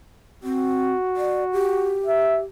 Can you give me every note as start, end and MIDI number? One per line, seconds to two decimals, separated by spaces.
0.43 0.93 60
0.43 1.99 66
1.17 1.44 74
1.53 2.44 67
2.06 2.40 76